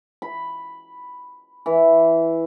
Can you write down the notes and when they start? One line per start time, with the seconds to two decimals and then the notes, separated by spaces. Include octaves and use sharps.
0.22 B5
1.66 E3